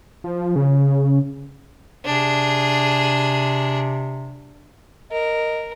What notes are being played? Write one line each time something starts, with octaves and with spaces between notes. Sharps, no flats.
F3
C#3
C3 D4 G#4
A#4 D#5